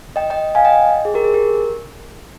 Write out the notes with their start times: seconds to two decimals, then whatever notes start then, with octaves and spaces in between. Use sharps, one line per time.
0.16 D#5 G5
0.30 D#5 G5
0.55 F5 G#5
0.65 D#5 G5
1.05 G#4
1.14 G4 A#4
1.24 G#4
1.34 G4 A#4